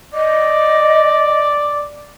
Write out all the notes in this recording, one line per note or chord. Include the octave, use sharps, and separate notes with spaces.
D5 D#5